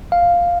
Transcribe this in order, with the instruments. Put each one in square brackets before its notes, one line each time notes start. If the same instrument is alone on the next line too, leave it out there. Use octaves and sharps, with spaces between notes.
[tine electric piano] F5